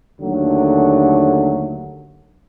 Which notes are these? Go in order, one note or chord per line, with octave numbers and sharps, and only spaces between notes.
D#2 D3 F#3 A3